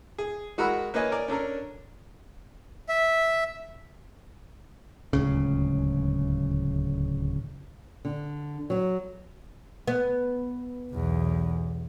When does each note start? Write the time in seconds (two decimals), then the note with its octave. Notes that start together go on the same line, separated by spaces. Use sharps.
0.18 G#4
0.58 G#3 F#4 A#4 F#5 B5 E6
0.94 A#3 B4 C#5 D#5 G#5
1.12 A#4 D5 G#5
1.28 C#4 D4 A4 A#4
2.89 E5
5.13 D1 C#2 C#3
8.05 D3
8.70 F#3
9.88 B3
10.91 B1 E2